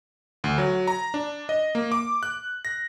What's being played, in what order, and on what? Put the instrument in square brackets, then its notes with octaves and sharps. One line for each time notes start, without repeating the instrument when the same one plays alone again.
[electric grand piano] D2
F#3
A#5
D4
D#5
A#3
D6
F#6
A#6